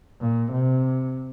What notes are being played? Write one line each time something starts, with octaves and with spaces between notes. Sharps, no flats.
A#2
C3